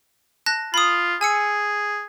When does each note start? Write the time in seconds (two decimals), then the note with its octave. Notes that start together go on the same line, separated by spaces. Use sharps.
0.46 A5 F#6 A#6
0.74 F4 B5 D#6
1.21 G#4 G#5 E6 C#7